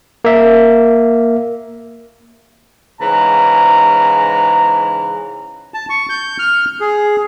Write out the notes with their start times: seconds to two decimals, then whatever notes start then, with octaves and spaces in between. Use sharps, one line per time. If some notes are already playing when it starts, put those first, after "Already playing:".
0.25 A#3 E5
3.01 G#2 C#3 E3 A#5
5.74 A5
5.90 C#6
6.10 G6
6.39 F6
6.80 G#4